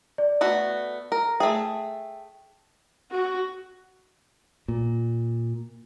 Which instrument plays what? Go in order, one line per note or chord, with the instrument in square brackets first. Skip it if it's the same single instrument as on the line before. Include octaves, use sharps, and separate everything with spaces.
[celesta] D5
[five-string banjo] A3 B3 F#4
A#4
[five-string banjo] A3 G#4 [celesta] E5 G5
[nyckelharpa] F#4
[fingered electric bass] A#2